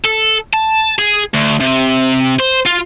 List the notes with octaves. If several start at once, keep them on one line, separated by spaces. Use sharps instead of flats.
A4
A5
G#4
D2
C3
C5
F4